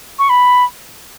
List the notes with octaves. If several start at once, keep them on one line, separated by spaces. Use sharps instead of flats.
C#6
B5